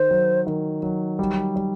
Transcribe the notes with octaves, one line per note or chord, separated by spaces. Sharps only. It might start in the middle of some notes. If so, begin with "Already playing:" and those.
Already playing: D#3 C5
F#3
D#3
F#3
G3
G3